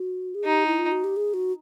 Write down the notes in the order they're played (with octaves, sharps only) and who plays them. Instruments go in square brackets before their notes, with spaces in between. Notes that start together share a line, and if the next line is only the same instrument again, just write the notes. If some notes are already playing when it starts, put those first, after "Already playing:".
Already playing: [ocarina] F#4
G#4
[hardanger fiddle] D#4 [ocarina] G4
[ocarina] E4
F4
F#4
G4
G#4
F#4